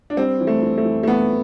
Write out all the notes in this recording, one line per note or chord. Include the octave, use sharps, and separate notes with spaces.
D4
G3 C4
E3
A3
E3
A3
E3
A3
E3 B3